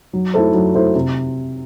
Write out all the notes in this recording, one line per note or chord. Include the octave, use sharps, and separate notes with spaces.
F#3
A3 E4 A4 C5
F#3
A3 E4 A4 C5
C3